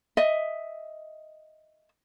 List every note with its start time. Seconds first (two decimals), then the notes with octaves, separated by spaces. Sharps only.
0.17 D#5 E5